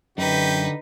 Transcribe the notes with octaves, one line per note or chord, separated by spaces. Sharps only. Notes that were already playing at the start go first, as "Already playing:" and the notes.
F#2 D3 D#4 G4 B4